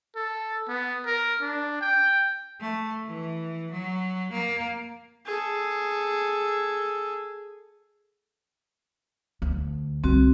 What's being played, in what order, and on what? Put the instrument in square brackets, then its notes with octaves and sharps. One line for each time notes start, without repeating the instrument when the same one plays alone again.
[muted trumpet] A4
B3
A#4
D4
G5
[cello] A3
E3
F#3
A#3
[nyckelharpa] G#4 A4
[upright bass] D2
[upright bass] C2 D3 [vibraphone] C4 F#4